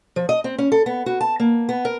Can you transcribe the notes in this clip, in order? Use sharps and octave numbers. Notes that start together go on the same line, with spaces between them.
F3
D#5
C4
C#4
A4
B3
F#4
A5
A#3
B3
A#4